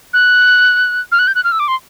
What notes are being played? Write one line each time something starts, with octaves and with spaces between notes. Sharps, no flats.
F#6
F6
F#6
G6
F#6
F6
E6
D6
C6